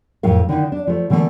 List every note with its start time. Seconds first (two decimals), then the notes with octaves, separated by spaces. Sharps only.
0.23 F2 A2 A#4 F5
0.49 D3 D#3 D#4 E4
0.72 D4
0.87 F3 A3
1.10 B2 D3 E3 F#3 A3 A#3